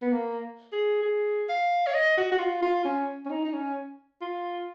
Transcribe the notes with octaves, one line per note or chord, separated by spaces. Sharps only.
B3
A#3
G#4
G#4
F5
C#5
D#5
F#4
F#4
F4
F4
C#4
C#4
D#4
D#4
C#4
F4